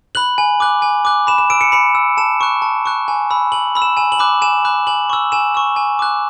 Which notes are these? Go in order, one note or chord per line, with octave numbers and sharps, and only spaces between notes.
B5 F#6 F#7
G#5
D6 F#6
G#5
D6 F#6
B5 E7
E7
E6 D7
C#7
B5 C#7
E6
A5 E7
C#6 F#6
A5
C#6 F#6
G#5
B5 E6
G#5 F#7
B5 E6
E7
G#5 E7
F#7
B5 D6 F#6
G#5 E7
B5 D6 F#6
G#5 F#7
C#6 E6
G#5 E7
C#6 E6
G#5
D6 F#6